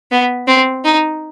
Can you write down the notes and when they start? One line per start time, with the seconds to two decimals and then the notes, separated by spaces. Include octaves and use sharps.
0.11 B3
0.47 C4
0.84 D#4